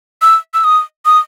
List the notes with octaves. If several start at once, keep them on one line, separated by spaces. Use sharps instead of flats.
E6
E6
D#6
D#6